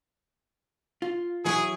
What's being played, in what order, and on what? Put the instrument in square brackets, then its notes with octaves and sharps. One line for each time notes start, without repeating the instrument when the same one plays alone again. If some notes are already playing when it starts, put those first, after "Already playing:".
[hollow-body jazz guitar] F4
[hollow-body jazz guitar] E3 F#3 E4 [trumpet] G#4